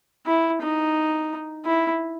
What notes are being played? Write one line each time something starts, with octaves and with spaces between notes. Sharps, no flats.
E4
D#4
E4